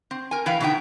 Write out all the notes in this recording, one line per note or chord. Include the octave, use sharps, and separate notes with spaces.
C4
A#4 G#5
E3 B4 F5 G5
B2 D3 D#4 E5 G5